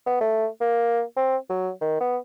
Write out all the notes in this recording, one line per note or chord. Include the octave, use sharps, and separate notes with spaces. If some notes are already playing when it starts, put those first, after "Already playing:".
B3
A3
A#3
C4
F#3
D#3
B3